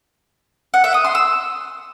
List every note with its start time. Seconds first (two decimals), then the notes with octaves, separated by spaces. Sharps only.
0.74 F#5
0.84 E5
0.94 D#6
1.04 C6
1.15 E6